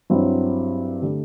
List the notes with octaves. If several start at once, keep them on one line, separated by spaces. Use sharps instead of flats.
G2 F#3 C4 E4
D3 A3 D4 G4